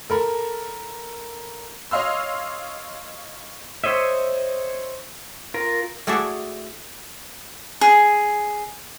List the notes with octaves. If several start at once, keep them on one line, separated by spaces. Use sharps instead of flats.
A4 A#4 B5
C#5 D#5 F5 C6 E6
C5 C#5 D#5 E5
F4 A#4
A3 E4 F#4 G#4 D5 E5
G#4